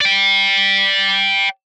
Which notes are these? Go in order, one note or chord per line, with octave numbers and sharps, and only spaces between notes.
D5 G5